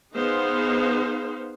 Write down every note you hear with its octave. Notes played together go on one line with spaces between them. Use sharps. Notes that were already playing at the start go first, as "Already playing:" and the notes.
B3 D#4 G#4 C5 F5